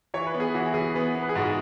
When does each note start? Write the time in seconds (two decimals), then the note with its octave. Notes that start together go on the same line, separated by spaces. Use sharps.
0.14 E3 C#5
0.26 B4
0.34 B3
0.40 G#4
0.54 E3 F#4
0.74 E3 G#4
0.95 B3 B4
1.15 B3
1.22 B4
1.29 G#4
1.36 G#2 F#4
1.45 G#4